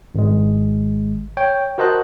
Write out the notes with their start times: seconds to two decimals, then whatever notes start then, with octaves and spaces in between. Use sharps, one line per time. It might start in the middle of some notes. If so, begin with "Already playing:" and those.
0.15 G#1 G#3
1.37 C#5 G5
1.78 F#4 A#4 C5 D#5 A5 F#6